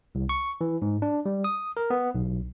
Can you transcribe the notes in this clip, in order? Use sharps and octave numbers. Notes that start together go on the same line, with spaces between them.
C2
C#6
E3
G#2
D4
G3
D#6
A#4
B3
B1